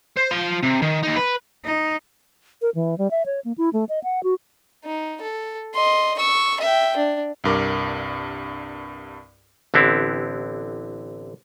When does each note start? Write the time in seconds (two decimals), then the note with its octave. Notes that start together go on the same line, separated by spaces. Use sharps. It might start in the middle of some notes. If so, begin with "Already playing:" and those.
0.17 C5
0.31 F3 C6
0.63 C3
0.82 D#3
1.03 D#2 D#4
1.17 B4
1.65 D#4
2.62 A#4
2.75 E3
2.98 G3
3.11 E5
3.26 C#5
3.45 A#3
3.58 E4
3.73 A3
3.89 D#5
4.04 F#5
4.23 F#4
4.85 D#4
5.22 A4
5.74 D#5 C6
6.18 C#6 E6
6.60 E5 G5
6.96 D4
7.44 C2 G2 A#4 D6
9.74 A1 D3 B3 C4 E4 G4